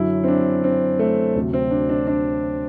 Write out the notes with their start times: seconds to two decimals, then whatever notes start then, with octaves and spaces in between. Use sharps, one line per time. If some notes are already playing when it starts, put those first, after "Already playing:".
Already playing: F#2 D3 F#3 E4
0.24 C4
0.28 D4
0.64 C4
0.99 A3
1.36 D2 C3 F#3
1.53 C4
1.71 D4
1.89 D4
2.07 D4